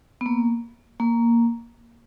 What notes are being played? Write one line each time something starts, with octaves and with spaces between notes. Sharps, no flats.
B3
A#3
A#3